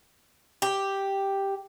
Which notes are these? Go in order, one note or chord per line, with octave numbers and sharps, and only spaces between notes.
G4